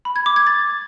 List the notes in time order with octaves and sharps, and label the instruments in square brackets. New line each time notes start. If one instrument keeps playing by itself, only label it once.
[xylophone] B5
G#6
D6
G#6
A6